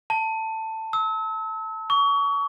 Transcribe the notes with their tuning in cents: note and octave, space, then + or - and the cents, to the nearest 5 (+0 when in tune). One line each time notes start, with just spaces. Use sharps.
A5 +15
E6 -35
C#6 +30